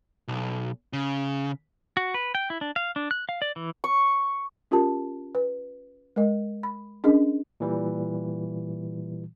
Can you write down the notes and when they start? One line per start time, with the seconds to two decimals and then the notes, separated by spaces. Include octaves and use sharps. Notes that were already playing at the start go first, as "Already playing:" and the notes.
0.28 B1
0.93 C#3
1.97 F#4
2.14 B4
2.35 G5
2.50 E4
2.61 D4
2.76 F5
2.96 D4
3.11 F#6
3.29 F5
3.42 D5
3.56 E3
3.84 C#6
4.71 C#4 F4 G4 A#4 A5
5.35 B4
6.16 G#3 A#4 D#5
6.63 B5
7.04 C#4 D4 G#4 A#4 D#5
7.60 A#2 E3 G3